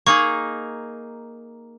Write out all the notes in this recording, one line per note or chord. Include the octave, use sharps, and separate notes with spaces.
A#3 D#4 G#4 C#6